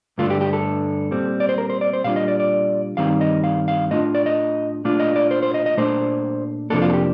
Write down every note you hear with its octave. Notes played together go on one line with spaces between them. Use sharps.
G2 D3 A3 D4 F4
G4
G4
A4
A#2 G3 C4
D5
C5
A#4
C5
D5
C5
A#2 G3 D4 F4 F5
D#5
D5
D5
G2 D#3 G3 C4 D#4 F5
D#5
F5
F5
A2 A3 D4 F4 D#5
D5
D#5
A#2 A3 D4 F4
D#5
D5
C5
C5
D#5
D#5
A#2 A3 D4 C5
F2 C3 F3 A#3 D4 A4
F4
A4
G4